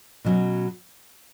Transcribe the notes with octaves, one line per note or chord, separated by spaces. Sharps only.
B2 F#3 C#4